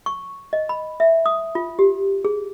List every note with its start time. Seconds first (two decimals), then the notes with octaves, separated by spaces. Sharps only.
0.06 C#6
0.53 D#5
0.69 B5
1.00 E5
1.26 D#6
1.55 F4
1.79 G4
2.25 G#4